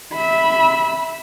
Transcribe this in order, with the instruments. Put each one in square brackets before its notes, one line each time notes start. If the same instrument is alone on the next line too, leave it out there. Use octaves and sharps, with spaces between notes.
[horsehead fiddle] E5 B5